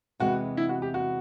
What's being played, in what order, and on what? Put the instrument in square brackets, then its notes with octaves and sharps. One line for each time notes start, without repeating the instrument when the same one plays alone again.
[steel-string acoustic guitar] E2 C3 E3 G#3 B3 [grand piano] F#4
[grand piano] E4
F#4
G4
F#4